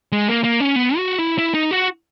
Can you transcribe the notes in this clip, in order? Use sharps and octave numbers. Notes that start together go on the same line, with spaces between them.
G#3
A#3
A#3
C#4
B3
F#4
E4
E4
D#4
F#4